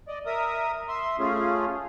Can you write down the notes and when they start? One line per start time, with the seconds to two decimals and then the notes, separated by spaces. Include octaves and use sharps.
0.08 D5 D#5
0.26 A#4 E5 D#6
0.88 E5 C6
1.19 A3 C#4 F4 G#4